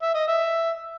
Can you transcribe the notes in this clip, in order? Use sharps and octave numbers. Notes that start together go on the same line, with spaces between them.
E5
D#5
E5